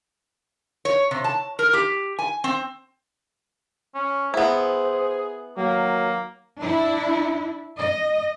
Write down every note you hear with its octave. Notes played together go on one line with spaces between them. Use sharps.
C#5
C3
A5
A#4
G4
G#5
C4
C#4
B3 E4 G#4 C5
D#2 F#3 A#3
D4 E4
D#5